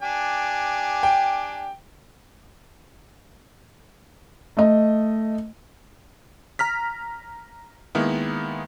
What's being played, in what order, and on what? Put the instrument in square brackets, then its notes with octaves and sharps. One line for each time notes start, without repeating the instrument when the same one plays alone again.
[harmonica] D4 G4 G#5
[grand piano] G5
[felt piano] A3 D#5
[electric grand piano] A#5 F6 B6
D#3 G#3 A#3 B3 E4